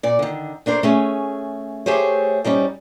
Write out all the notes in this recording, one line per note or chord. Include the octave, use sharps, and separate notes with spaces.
A#2 D5
D3 D#3
A3 D4 A#4 C5
A3 C#4 G#4
A3 G4 G#4 C5 C#5
G#2 G3 C#4 D#4